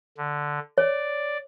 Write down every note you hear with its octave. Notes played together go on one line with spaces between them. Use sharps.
D3
C#5 D5